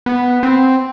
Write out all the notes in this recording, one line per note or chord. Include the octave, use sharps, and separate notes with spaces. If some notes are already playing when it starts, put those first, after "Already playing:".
B3
C4